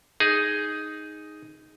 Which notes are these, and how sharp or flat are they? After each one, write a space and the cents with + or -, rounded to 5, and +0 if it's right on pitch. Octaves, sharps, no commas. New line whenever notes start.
D#4 +0 G#4 +0